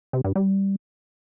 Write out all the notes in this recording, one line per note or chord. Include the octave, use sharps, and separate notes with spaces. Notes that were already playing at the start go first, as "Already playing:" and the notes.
C3
G2
G3